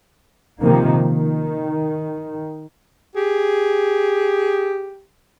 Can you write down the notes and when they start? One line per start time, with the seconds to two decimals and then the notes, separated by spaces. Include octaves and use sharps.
0.62 C3 D#3 F3 A#3
1.04 D#3
3.16 G4 G#4